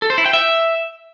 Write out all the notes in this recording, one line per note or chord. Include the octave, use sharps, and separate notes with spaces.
A4
C5
E4
G5
E5